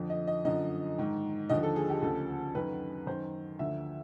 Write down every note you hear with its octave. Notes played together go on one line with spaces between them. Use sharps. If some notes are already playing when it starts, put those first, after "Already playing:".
Already playing: F2 D3 F3
D#5
D#5
F#2 D3 F3 D#5
G#2 D#3
D#2 D3 F3 D#5
A4
G#4
G4
D2 C#3 F3 A4
F#2 D#3 B4
F#2 D#3 C5
D2 D3 F3 E5